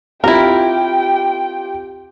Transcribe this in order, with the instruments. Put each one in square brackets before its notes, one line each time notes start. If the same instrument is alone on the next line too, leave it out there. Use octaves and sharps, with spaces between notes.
[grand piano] C4 F4 G4 [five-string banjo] E4 A#4 [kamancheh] G5